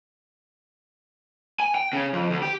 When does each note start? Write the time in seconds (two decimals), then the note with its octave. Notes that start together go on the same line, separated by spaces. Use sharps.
1.60 G#5
1.75 G5
1.93 C#3
2.13 F2
2.30 D2
2.42 G4